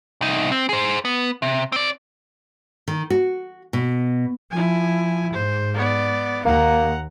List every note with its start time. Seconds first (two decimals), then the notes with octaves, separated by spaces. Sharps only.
0.21 C2 D#4
0.52 C4
0.69 G#4 C5
1.05 B3
1.42 C3
1.72 C4 D5
2.88 D#3
3.10 F#4
3.73 B2
4.51 F3 E4 G#5
5.33 G#2 C5
5.74 B3 D5
6.45 D#2 A#3 F#5 A#5